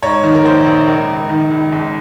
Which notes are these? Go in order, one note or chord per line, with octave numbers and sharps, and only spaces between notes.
G#2 C#5
D#3
A#4
A#1 C5
A#1
C#2 A#4
C#2
D#3
C#2
G#1